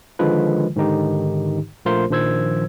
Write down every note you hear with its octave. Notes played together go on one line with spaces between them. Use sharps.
D3 D#3 F3 G#3 F4 B4
G#2 D3 D#3 D#4 G4
A#1 A3 F4 A#4 C5 C6
A#1 D#3 F3 C5 E6 G#6